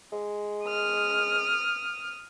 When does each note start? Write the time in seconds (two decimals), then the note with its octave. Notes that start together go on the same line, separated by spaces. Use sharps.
0.12 G#3
0.66 D#6 F6